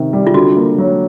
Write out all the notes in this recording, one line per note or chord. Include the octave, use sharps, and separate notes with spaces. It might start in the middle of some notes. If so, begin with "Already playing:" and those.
Already playing: C3 D#3
G3
F4
D3 F#4
A#3
F#3